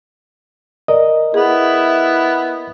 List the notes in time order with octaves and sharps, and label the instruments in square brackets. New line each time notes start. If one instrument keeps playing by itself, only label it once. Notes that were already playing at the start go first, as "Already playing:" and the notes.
[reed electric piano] A#4 D#5 [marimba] D5
[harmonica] B3 [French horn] E4 [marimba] G#4